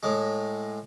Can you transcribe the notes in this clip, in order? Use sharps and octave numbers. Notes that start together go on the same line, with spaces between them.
A2 G#3